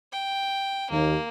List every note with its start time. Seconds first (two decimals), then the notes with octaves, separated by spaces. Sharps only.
0.13 G5
0.91 D#2 A#3